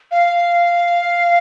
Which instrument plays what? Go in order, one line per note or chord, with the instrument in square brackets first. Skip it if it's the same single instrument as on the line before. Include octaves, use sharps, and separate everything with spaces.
[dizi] F5